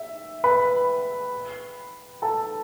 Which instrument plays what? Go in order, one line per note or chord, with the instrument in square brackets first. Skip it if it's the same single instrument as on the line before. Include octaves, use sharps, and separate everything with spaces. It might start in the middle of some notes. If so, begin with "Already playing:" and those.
Already playing: [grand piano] E5
B4 B5
A4 A5